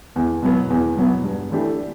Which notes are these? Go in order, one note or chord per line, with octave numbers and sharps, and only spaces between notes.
E2
B2 F#3 B3
E2
B2 F#3 B3
G2
E3 A3 D4 G4